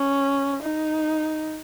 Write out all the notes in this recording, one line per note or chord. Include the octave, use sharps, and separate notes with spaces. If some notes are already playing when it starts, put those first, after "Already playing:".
Already playing: C#4
D#4